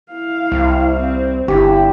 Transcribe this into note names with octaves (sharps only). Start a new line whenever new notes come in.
E4 F5
C2
C4
G1 E4 G4